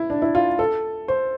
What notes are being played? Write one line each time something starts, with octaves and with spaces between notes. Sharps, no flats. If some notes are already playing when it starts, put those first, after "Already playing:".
Already playing: E4
D4
E4
F4
A4
C5